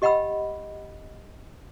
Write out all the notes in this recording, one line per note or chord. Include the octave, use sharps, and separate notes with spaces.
G4 D#5 F#5 G5 B5 E6